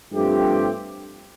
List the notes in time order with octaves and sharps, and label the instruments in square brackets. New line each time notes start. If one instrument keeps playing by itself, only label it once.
[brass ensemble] G2 F3 A3 C4 G4